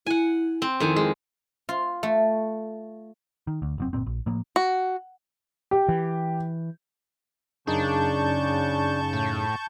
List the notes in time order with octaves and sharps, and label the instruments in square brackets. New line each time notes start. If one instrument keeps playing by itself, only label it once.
[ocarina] E4 [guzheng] F#5 G#5
[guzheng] C4
[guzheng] F2 D#3 G#5 [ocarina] E4
[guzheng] G#3
F4
A3
[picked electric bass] D#3
D2
F1 F#2 C4
G1 E2 A#2 C4
A#1
A2 F3 A#3
[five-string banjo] F#4
[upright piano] G4
[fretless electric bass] E3
[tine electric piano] F#2 D#4 G#4 [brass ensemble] C#3 [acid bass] D4 [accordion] A5 C#6 G6
[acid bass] A2